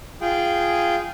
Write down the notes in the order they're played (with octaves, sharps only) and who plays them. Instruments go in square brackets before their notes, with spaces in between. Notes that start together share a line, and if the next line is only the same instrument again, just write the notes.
[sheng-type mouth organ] F4 G#4 G5